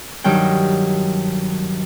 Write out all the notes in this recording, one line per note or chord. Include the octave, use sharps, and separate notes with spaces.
G2 D#3 F#3 G5